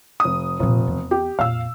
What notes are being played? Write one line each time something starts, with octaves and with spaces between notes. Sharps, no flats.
F1 D#6
F1 A#2 D3
E2 B3
G4
F2 A#2 F5 E6